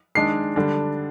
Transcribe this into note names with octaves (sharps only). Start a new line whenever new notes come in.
D#3 G#3 D4 C7
D3 G3 D4